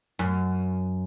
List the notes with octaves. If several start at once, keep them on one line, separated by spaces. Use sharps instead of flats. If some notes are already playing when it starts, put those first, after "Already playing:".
F#2